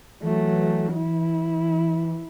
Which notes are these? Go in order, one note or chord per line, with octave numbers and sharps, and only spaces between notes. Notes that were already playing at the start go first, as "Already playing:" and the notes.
E3 F#3 A3
E4